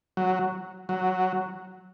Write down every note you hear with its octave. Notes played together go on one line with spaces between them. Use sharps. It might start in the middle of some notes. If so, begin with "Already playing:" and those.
F#3
F#3